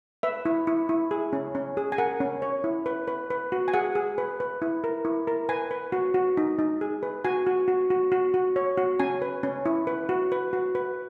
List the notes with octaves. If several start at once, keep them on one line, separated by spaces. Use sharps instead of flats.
B4 E5
E4
E4
E4
G#4
C#4
C#4
G#4
G#5
A#4 F#5
C#4
C#5
E4
B4
B4
B4
F#4
G#5
G#4 F#5
G#4
B4
B4
E4
A#4
E4
A#4
B4 G#5
B4
F#4
F#4
D#4
D#4
G#4
B4
F#4 G#5
F#4
F#4
F#4
F#4
F#4
C#5
F#4
C#4 G#5
B4
C#4
E4
B4
F#4
B4
F#4
B4